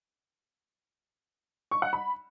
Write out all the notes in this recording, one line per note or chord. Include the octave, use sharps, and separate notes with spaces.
C#6
F#5
B5